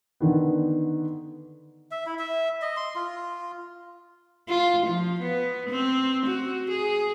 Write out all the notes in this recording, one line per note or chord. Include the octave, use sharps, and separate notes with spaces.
D3 D#3 B3
E5
E4
E5
D#5
C6
F4
F4
F3
B3
C4
F#4
G#4